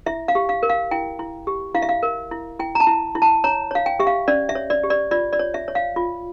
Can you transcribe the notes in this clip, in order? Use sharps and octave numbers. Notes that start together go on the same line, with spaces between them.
E4 E5
F5
G4
F5
A#4
F5
E4 G5
E4
G4
E4 F5
E5
F5
A#4
E4
E4 G5
A#5
A5
E4
E4
A5
C#5 A#5
C#5 F5
G5
G4 E5
F5
C#4 D5
E5
C#5
D5
G4
D5
F4 D5
D5
C#5
E5
C#5
F5
F4